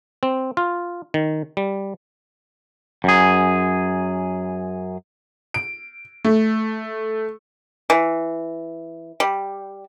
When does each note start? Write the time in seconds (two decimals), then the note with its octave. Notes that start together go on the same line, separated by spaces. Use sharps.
0.23 C4
0.57 F4
1.14 D#3
1.57 G3
3.04 F#2 G#4
5.54 D7
6.25 A3
7.90 E3
9.20 G3